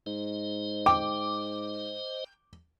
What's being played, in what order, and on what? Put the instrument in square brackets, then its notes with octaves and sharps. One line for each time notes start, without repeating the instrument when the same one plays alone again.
[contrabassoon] G#2 [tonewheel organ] C5 D#5
[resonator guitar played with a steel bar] G5 [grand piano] D6